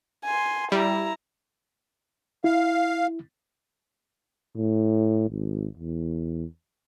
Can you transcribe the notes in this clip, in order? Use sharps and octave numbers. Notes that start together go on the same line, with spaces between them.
G#5 C6
G3 E4 A#5
E4 F5
A2
G#1
E2